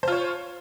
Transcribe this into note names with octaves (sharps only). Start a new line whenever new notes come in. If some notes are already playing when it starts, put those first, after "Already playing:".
F4 C5 C#5